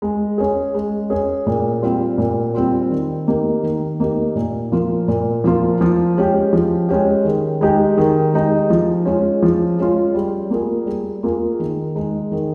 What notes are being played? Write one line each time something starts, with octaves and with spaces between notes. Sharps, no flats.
G#3
C#4 G#4
G#3
C#4 G#4
A#2
G3 C4 F4
A#2
G3 C4 F4
D#3
A#3 D#4 G4
D#3
A#3 D#4 G4
A#2
F3 A#3 F4
A#2
F3 A#3 F4
F3
G#3 C#4 G4
F3
G#3 C#4 G4
D#3
G#3 D#4 G4
D#3
G#3 D#4 G4
F3
G#3 C#4 F4
F3
G#3 C#4 F4
G3
A#3 F4 G#4
G3
A#3 F4 G#4
D#3
G#3 D#4
D#3